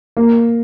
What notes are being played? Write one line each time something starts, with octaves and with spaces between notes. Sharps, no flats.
A#3